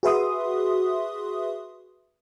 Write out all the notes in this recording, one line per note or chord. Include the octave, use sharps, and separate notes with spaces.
F#4 G#4 B4 E5 C6 D#6